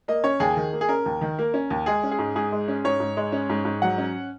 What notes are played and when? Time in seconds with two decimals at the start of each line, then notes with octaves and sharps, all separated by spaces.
0.08 A#3 D#5
0.24 C#4 C#5
0.40 D#2 G#4
0.57 D#3
0.73 A#3
0.81 G#4
0.89 C#4 A#4
1.06 D#2
1.21 D#3
1.39 A#3
1.54 C#4
1.70 D#2
1.86 G#3 G#4
2.03 C#4
2.11 G#4
2.19 G#2
2.36 G#2 G#4
2.52 G#3
2.68 C#4
2.84 G#2 C#5
3.00 G#2
3.17 G#3
3.32 C#4
3.50 G#2
3.65 G#2
3.82 F#3 F#5
3.98 C#4